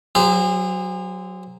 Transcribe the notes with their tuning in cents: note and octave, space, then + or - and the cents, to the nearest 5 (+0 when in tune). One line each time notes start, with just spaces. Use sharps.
F#3 +0 G#4 -40 C5 -20